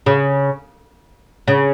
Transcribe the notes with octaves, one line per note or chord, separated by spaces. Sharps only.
C#3
C#3